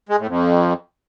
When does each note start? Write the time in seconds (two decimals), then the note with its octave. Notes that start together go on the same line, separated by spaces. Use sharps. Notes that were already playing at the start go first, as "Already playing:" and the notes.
0.09 G#3
0.18 A2
0.27 F2